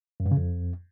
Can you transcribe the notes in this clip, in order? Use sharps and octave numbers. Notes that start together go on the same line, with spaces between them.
F#2
G2
C#3
F2